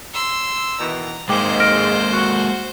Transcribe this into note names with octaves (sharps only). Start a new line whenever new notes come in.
C6 E6
B2 D#3 E3 A#5
G#2 G#3 A#3 C5 G5 D6 G6
F6 A#6 D7
F#4